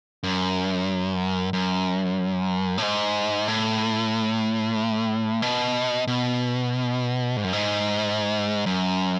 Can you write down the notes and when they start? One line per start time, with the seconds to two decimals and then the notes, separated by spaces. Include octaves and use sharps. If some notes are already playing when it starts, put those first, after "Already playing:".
0.23 F#2
1.53 F#2
2.78 A2
2.82 G#2
3.48 A2
5.42 B2
6.07 B2
7.37 G#2
7.44 F#2
7.53 G#2
8.66 F#2